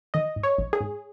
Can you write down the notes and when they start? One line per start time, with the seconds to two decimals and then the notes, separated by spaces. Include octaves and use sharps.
0.14 D#3 D#5
0.36 G#2
0.43 C#5
0.58 A#1
0.73 G#4
0.81 G#2